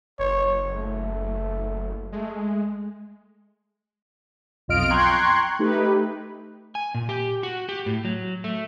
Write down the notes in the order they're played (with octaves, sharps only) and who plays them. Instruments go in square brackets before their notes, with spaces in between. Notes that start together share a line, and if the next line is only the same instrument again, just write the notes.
[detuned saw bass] F#1 [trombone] C#5
[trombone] A3
[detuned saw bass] G#3 [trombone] A3
[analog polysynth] B1 F2 F4 D#5 F6 D7
G5 A#5 C6 C#6 F#6 G#6
A3 D#4 G4 B4
[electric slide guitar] G#5
A#2
G4
F#4
G4
A2
F#3
A3